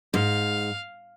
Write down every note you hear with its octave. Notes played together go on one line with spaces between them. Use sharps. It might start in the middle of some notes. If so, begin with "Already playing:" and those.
G#2 F5